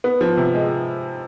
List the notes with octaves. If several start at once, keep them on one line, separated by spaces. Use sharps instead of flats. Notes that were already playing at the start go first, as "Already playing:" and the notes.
B3
F3
C3
G#3